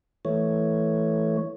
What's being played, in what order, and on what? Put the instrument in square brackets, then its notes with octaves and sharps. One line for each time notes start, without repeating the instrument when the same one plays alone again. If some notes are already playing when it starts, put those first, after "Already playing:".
[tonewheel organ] E3 A3 C#5